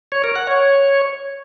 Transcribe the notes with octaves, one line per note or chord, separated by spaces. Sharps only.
C#5
A#4
F#5
C#5